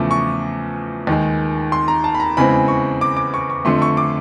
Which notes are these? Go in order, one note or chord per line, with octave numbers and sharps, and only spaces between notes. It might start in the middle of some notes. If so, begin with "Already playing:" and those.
Already playing: E2 C#3 F3 A3 D6
C#6
D#2 D#3 G#3
C6
A#5
A5
B5
A#5
E2 C#3 E3 G#3 C4 B5
C#6
D6
D6
C#6
C#6
F2 D3 F3 A3 C6
C#6
D6